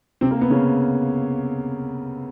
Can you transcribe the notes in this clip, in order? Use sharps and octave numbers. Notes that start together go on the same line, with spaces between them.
C3 C4
A#3
B3
C#3 C#4